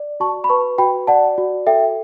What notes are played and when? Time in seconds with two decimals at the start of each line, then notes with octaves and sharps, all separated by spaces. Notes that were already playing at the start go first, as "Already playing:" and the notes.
Already playing: D5
0.20 F#4 A5 C#6
0.44 B5
0.49 B4 A5 C#6
0.78 F#4 G5 B5
1.07 D5 F#5 A5
1.38 F#4
1.67 A4 E5 G5